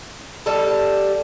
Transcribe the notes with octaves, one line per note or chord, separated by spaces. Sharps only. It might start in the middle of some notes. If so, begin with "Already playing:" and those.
G3 A4